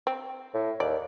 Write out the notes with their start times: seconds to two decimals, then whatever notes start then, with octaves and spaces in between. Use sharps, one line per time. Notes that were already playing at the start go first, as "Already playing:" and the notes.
0.07 C4
0.54 A2
0.80 D#2 D5